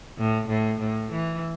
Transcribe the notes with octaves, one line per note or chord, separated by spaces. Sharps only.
A2
A2
A2
E3